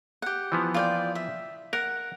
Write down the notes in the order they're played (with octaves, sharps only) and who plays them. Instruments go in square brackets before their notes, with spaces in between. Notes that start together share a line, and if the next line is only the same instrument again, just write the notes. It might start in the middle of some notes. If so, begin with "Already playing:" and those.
[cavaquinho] G4 F#5
[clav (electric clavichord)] E3 F3 B3
[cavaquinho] F4 D5 G5
E5
[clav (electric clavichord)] A#4 [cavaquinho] F#5